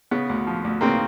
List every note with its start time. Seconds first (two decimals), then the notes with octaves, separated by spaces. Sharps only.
0.11 C#3 B3
0.29 D2
0.47 F3
0.64 D2
0.81 C#3 A#3 C4